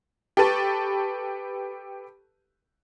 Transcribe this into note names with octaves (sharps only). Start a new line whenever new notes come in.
G4 A4 B4 A5 C#6